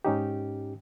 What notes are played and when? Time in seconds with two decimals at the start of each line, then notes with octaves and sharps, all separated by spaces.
0.05 G#2 C#4 D#4 G4